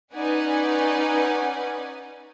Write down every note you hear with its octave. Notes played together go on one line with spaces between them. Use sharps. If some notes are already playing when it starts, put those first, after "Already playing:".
C#4 D#4 B4 D5 F#5 G#5